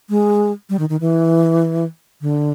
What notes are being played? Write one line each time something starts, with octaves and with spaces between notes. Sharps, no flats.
G#3
G3
D#3
D#3
E3
D3